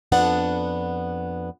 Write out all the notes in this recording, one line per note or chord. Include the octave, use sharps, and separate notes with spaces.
F2 B3 D4 F#5